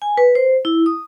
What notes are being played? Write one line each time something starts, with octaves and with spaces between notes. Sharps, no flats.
G#5
B4
C5
E4
D#6